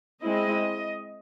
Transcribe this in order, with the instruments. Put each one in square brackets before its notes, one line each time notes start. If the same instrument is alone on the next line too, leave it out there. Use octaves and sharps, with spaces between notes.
[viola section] G#3 C4 E4 D#5